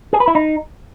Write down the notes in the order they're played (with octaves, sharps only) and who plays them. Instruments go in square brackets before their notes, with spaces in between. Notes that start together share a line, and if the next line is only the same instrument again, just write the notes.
[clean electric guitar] G#4
B4
E4
D#4